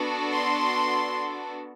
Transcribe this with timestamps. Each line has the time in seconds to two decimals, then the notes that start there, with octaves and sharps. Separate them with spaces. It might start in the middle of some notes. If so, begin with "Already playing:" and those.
Already playing: B3 D4 F#4 A4
0.31 C6